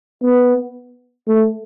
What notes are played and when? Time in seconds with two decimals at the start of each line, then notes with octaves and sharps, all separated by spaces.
0.23 B3
1.28 A3